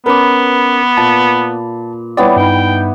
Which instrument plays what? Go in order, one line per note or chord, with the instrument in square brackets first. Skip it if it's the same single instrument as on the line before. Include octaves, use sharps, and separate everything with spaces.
[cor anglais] B3 [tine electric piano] C#4 A#4 [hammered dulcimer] B4 D6
[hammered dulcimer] A#2 [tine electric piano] A5
[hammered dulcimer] G3 B3 E4 [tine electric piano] C#5 D5
[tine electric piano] G2 D#4 [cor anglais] G5